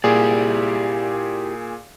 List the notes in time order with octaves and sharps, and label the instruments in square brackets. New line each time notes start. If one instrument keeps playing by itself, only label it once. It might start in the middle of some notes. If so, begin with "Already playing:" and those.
[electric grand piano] A#2 G#4 [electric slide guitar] E4 G4 D5